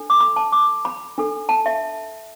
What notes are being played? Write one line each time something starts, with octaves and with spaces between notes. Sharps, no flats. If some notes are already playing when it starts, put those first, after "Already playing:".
Already playing: D4 A4
D6
B5
A5
D6
B5
D4 A4
A5
E5